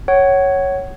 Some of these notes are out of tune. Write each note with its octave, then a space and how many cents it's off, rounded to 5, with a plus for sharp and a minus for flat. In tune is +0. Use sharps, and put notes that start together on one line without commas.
C#5 +0 F#5 +25